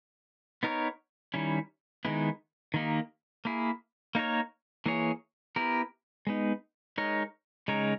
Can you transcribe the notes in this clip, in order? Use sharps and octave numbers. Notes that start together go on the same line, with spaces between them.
B3 D#4 A#4 C#5
D#3 G3 C#4 E4
D#3 G#3 B3 E4
D#3 A#3 D#4 G4
A#3 E4 G#4
A#3 D#4 A#4 C#5
E3 A#3 E4 G#4 C#5
B3 E4 G4 A#4
G#3 B3 D#4
G#3 D#4 A#4 C#5
C#3 G#3 D#4 A#4 C#5